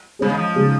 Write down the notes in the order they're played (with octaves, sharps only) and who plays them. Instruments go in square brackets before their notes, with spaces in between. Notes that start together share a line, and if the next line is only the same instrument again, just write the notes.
[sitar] C#3 [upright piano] G#3 C#4 G#4
[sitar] D#3
F3
[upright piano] C#3 G#3 D#4 G#4